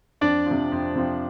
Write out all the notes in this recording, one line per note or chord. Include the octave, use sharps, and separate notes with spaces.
F2 D4 D5
C3 F3
F2
C3 F3